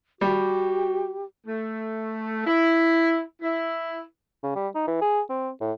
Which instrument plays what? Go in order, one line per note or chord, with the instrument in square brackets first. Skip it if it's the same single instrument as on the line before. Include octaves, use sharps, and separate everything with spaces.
[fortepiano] G3 [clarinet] F#4 [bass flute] G4
[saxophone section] A3
E4
E4
[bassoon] C#3
G3
D#4
E3
G#4
C4
A2